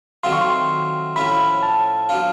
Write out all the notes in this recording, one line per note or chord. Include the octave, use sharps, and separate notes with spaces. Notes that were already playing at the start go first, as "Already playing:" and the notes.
D#3 F#3 A3 C4 F4 C6
C#6
C6
A2 F3 A3 C#4 E4 B5
A5
F#3 B3 D4 F4